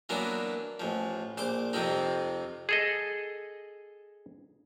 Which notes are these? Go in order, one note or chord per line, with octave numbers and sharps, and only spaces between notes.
E3 F#3 A#3 B3 D4
A1 F3
A#1 C5 D6
F2 C3 F3 C4 D#4
G#4 A4 D#5